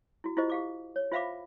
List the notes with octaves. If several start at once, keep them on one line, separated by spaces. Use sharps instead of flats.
E4 F#4
E4 F4 G4 C5 D#5
G4 F5 D6
C#5
F4 C5 E5 F5 B5 D6